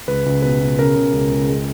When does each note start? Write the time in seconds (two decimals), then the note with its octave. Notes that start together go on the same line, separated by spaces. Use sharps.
0.08 C#2 B4
0.26 C#2
0.42 B2 B4
0.61 B2
0.79 C#3 A#4
0.96 C#3
1.13 C#2
1.32 C#2
1.49 G#3